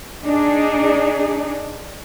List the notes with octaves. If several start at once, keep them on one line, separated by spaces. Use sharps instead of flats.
D4 D#4 G#4